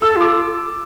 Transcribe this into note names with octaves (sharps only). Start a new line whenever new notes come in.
A4 E6
F4 D6